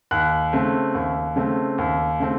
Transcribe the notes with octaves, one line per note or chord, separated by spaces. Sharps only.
D#2 F#6
C#3 A3 C4
D#2
C#3 A3 C4
D#2
C#3 A3 C4